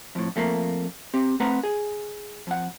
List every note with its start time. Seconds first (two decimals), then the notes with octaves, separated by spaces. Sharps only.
0.15 F2 A2
0.36 F2 A3 A#3
1.14 C4 G4
1.40 A3 C4 B4 F#5 A#5
1.63 G#4
2.47 F2 F#5